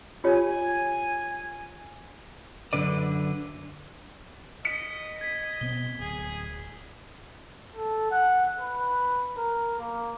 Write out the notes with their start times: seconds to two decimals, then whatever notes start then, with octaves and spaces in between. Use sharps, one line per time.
0.24 F4 G4 C#5 G#5
2.73 F#2 D3 B4 D5
4.65 D#5 B6 C#7
5.21 G#6 B6
5.61 B2 B3 C4 G7
6.00 D1 G#4
7.76 A4
8.11 F#5
8.60 B4
9.37 A#4
9.79 A#3